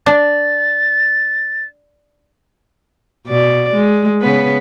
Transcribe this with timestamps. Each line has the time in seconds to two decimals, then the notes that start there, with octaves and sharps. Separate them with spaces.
0.06 D4 A6
3.27 B2 D5
3.74 G#3
4.21 C#3 B3 B4